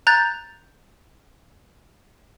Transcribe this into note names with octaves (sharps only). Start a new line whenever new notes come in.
A#5 F#6 G6 A6